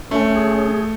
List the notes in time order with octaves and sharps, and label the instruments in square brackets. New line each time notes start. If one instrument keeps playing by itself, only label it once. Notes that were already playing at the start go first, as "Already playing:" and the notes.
[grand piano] A3 [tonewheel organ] C#4
[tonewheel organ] G#4